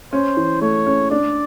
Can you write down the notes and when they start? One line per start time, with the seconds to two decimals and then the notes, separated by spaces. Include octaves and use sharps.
0.13 C#4 C5
0.37 E3
0.61 A3 C#5
0.86 C#4
1.11 D4 D5